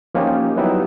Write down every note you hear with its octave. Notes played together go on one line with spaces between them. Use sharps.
F3 A#3 C#4 D#4 F4 G4
F#3 G3 B3 D#4 E4 G4